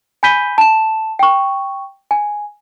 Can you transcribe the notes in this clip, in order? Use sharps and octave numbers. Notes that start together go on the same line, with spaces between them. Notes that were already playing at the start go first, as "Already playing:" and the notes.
G#5 B5 G6 B6 D#7 G7
A5 E7
G5 C#6
G#5